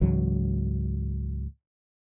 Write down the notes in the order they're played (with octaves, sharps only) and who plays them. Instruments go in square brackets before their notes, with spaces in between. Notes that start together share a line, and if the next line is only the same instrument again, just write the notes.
[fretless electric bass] C#2 G#2 E3 F#3